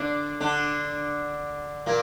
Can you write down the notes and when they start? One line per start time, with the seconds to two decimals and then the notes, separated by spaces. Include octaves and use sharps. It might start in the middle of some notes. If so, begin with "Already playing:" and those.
Already playing: D3 D4
0.41 D3 D4
1.86 A#2 A#3